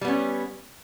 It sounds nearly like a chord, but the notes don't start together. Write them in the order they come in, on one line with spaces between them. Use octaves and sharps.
G3 B3 C#4